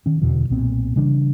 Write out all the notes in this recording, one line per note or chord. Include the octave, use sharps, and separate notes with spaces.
D#3 C#4
E2 B2 D3 E3
B1 A#2 B3 C4
C#3 E3 G3 D4